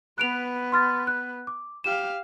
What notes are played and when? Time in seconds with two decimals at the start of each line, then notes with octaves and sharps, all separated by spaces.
0.18 B3 B4 F#6 D7 F7
0.72 C6 F6 A6
1.07 F#6
1.47 D6
1.84 G4 F5 E7